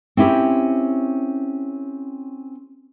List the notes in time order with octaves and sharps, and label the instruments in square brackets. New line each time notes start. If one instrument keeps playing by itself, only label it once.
[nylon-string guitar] C4 C#4 E4 G4 A#4